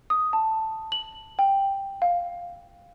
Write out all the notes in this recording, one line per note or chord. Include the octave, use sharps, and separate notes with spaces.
D#6
A5
F#7
G5
F5